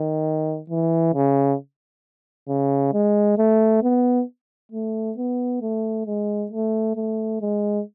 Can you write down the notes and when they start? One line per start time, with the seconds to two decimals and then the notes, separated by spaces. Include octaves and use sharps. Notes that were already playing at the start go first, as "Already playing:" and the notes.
Already playing: D#3
0.70 E3
1.14 C#3
2.49 C#3
2.93 G#3
3.38 A3
3.83 B3
4.72 A3
5.17 B3
5.61 A3
6.06 G#3
6.51 A3
6.96 A3
7.41 G#3